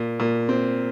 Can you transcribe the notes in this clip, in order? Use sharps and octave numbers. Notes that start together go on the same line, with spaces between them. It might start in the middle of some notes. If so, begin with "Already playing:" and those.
Already playing: A#2
A#2
C4